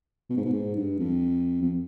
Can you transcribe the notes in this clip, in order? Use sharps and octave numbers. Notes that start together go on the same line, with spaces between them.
B2
G#2
B2
G#2
G2
F2
F2